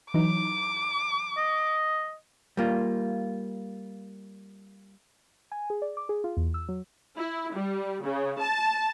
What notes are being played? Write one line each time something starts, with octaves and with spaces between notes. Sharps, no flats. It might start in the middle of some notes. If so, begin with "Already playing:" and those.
E3 F#3 D#4 D6
D#5
G3 A#3 F4
G#5
G#4
D5
D6
G#4
F4
E2
E6
F#3
E4
G3
C#3
A5